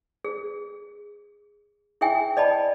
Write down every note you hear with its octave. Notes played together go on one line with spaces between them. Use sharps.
G#4
E4 G#4 E5 G5 G#5
D5 D#5 A5 B5